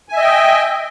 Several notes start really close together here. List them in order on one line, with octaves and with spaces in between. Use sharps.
G#5 E5 D#5 G5